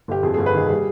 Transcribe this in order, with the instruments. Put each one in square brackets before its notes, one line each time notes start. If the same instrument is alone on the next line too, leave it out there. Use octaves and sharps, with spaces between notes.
[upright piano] G1 G4
F2 G#4
G#4
G1
B4
D#3 G#4
G3 G#4